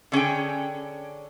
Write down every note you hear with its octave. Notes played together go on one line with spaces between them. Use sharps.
D3 C#4 G#4 G5